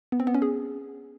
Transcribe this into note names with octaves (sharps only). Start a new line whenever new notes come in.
B3
C4
B3
C#4
G#4